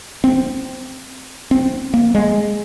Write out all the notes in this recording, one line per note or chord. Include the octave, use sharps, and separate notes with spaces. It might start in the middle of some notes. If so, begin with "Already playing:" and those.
C4
C4
A#3
G#3